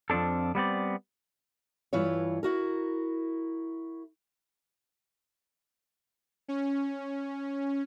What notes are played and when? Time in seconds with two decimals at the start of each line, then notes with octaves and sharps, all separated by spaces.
0.10 F2 F3 C4 D4 A4
0.55 G3 B3 C4 D5
1.93 G2 E3 E4 F4 C#5
2.43 E4 F#4 A#4
6.48 C#4